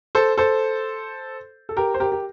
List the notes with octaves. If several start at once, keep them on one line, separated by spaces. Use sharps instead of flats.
A4 C5
A4 C5
A4
G4 A#4
C5
G4 A#4
G4